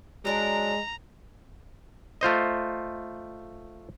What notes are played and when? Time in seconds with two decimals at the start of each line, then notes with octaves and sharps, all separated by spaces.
0.25 F#3 G#3 D4 A#4 A#5
2.21 A3 F4 C5 D#5